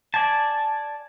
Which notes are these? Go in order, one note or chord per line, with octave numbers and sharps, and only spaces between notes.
D5 G#5 A5